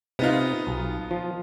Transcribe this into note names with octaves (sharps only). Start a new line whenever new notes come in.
C3 B3 D#4 F4
B1
F3